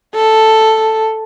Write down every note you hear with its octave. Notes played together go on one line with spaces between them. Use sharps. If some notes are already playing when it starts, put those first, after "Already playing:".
A4